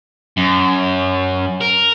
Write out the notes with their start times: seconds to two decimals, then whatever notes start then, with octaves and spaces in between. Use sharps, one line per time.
0.37 F#2
1.61 A#4